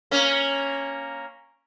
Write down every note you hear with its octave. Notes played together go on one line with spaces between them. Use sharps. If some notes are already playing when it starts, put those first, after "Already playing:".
A#3 C#4